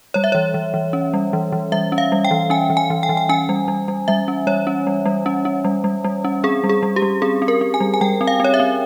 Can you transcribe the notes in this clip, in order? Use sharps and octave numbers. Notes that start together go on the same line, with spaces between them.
G3 C#5
E5
E3 C#5
E3
E3
C#4
G3
E3
E3
G3 E5
C#4
F5
G3
G5
E3
C#4 G#5
E3
G#5
E3
G5
E3
G5
C#4 G#5
G3
G3
G3
G3 E5
C#4
G3 C#5
C#4
G3
G3
C#4
C#4
G3
G3
G3
C#4
C4 G#4
G3
G#4
G3
G4
G3
C4 G#4
C4
A#4
C4
G#5
G3
G#5
G3 G5
C4
F5
C4 C#5
E5
C4